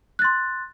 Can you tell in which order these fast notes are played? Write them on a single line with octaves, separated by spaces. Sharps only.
F#6 A6 C6